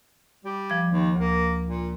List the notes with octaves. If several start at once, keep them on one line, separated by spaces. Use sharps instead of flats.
G3
F3 G#6
D#2
D2 A#3
A#2